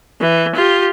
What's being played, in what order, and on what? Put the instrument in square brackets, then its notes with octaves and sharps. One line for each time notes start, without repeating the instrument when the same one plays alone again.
[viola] E3
F4 G4